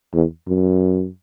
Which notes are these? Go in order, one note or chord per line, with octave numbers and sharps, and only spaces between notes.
E2
F#2